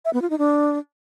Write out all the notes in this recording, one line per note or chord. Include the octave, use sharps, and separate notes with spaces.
E5
B3
F4
D#4
D4